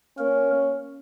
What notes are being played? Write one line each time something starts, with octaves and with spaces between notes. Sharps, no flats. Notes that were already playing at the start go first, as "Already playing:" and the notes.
A#3 C#4 A#4